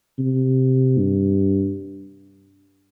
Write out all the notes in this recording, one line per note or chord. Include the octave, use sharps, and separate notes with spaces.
C3
G2